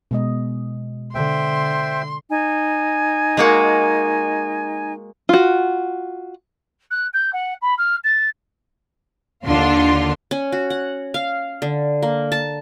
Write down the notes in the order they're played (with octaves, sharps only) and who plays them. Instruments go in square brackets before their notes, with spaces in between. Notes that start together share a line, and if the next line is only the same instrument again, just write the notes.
[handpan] B2 G#3 D#5
[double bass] D3 [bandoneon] C5 E5 G5 [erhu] C6
[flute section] D#4 G#5
[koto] G#3 A#3 F#4
[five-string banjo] F4 F#4
[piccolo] F#6
G6
F#5
B5
F6
A6
[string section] D#2 D3 D4 F4 C6
[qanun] C#4
F#4
F#5
F5
D3
A#3
A5